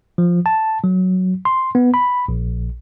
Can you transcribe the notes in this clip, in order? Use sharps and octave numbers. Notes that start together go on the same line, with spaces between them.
F3
A5
F#3
C6
B3
B5
A#1